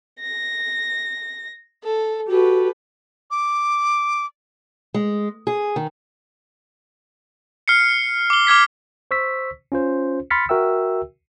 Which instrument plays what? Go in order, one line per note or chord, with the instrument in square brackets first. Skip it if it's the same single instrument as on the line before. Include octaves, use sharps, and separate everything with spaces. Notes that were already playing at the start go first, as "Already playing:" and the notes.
[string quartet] A#6
A4
[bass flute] F#4 [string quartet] G4 A4 B4
[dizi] D6
[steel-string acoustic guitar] G#3
G#4
D#3
[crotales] F6 C7 C#7
D6 G7
D6 F6 G#6 B6
[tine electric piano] C5 C#6 E6 B6
C#4 F4 C5
B5 C6 F6 A6 B6 C#7
F#4 A#4 E5 G5 E6